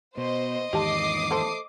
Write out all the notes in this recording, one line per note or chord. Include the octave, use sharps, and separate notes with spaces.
B2 C5 D#5
E2 G#2 D#3 G4 A5 D6 D#6 C7
A3 A4 C5